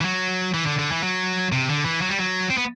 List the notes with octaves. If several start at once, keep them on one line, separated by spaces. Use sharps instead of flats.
E3
F#3
E3
D3
D3
E3
F#3
C3
D3
E3
F#3
G3
F#3
C4
B3